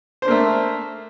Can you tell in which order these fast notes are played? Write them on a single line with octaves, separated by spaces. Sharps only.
C5 D4 A#3 A3